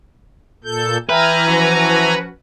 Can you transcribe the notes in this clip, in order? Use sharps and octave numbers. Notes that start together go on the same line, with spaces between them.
A#2 A4 G6
E3 B4 E5 G5 G#5 A#5 F6
F3 C#4 F#4